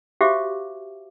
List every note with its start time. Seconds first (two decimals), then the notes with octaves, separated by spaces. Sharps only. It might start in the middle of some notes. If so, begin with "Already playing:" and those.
0.21 F#4 G4 C5 E5 F5 D6